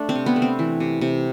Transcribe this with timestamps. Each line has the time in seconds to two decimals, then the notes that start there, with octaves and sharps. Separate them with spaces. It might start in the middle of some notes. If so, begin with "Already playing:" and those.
Already playing: A3 D4
0.09 C4
0.16 C3
0.26 B3
0.36 A3
0.42 C4
0.59 E3
0.80 C3
1.01 C3